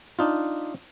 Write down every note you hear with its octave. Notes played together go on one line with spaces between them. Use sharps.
D4 D#4 F4